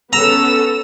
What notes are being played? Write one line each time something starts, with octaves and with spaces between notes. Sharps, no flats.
B3 C#4 A4 A#5 E6